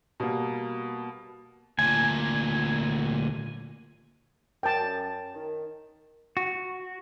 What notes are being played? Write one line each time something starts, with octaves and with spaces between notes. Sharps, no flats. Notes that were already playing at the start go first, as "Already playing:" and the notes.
B2 G3 A#3
D2 A#2 G#5
F#2 G5 A5
D#3
F#4